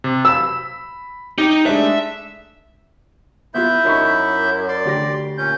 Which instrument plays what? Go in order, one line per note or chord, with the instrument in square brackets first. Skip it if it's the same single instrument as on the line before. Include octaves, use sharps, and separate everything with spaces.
[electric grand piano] C3
[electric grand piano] B5 [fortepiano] E6
[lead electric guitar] D#4 [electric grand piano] G4
[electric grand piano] G#3 A3 D4 [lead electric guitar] E5
[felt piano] B3 F4 G4 [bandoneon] E4 E5 G6
[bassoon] F#2 [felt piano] D#4 B5 C#6
[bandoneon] D5 C6
[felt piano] D2 G4 A#6
[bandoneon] A#2 C#4 G6